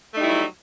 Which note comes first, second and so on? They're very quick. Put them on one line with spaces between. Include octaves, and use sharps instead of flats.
A3 D#4 G3 E4 F#3